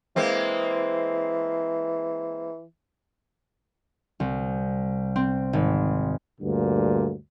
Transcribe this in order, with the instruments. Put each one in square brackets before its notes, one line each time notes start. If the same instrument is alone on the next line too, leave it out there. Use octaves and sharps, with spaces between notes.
[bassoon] E3 [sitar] G#3 A#3 C4
[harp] C2
C4
G#1
[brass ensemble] D2 G2 A#2 D3